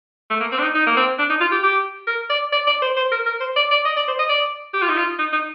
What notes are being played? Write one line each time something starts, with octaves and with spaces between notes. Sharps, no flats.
A3
A#3
C4
D4
D#4
D#4
A#3
C4
D4
D#4
F4
G4
G4
A#4
D5
D5
D5
C5
C5
A#4
A#4
C5
D5
D5
D#5
D5
C5
D#5
D5
G4
F4
D#4
F4
D#4
D#4